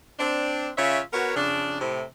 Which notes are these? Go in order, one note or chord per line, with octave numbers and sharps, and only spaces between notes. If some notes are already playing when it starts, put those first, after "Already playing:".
C4 D4
C#3 F4 C#5 E5
B3 F#4 A#4 B4 C#5
F2 C#3 D4
A2 C3